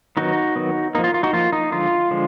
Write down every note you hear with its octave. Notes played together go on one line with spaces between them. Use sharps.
D#3 F#3 B3 D#4 F#4
D#3 F#3 B3
F3 A#3 D#4
F4
F4
D#4 F#4
F3 A#3 F4
D#4
D3 F3 G#3 F4
D3 F3 G#3